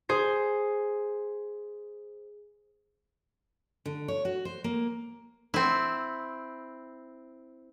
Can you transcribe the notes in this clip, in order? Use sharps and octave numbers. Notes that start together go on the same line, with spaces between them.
G#4 C5 C7
D3
C#5
F#4
C5
A#3
C4 E4